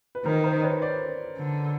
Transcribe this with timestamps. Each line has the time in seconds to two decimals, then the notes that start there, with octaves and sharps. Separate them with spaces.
0.15 B4
0.25 D#3 A#4 C5
0.44 A#4 C5
0.63 B4 C#5
0.82 C5 D5
1.38 D3